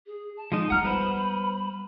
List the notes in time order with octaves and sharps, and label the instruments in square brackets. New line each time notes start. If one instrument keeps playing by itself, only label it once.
[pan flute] G#4
A5
[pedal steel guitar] F3 G#3 D#4
[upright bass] G3 B3 [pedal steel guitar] F#5 F6 [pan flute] A#5
[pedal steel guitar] B4 C5 [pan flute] B5